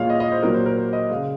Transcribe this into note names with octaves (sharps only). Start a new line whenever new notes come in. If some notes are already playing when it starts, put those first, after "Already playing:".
Already playing: A#2 F3 G#3 C#5 F5
D#5
D#5
C5
A#2 F#3 A#4
C5
A#4
C5
D#5
C#3 G#3 F5